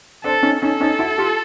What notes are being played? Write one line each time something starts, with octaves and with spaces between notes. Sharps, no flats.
C4 D4 A4
C#4 D#4
C#4 D#4 A4
C#4 D#4
E4 F#4
F4 G4